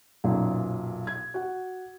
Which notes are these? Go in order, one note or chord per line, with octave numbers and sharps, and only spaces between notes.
B1 F#2 A#2
G#6
F#4 F#5